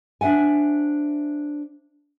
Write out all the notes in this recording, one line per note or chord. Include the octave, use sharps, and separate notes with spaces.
D4 C5 E5 F#5 G#5